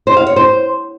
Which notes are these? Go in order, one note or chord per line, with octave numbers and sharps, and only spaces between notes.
C5
F5
C#5
C5